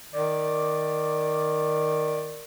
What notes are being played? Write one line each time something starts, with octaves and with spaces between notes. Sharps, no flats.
D#3 D5